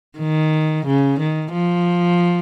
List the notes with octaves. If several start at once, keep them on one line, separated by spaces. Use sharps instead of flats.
D#3
C#3
D#3
F3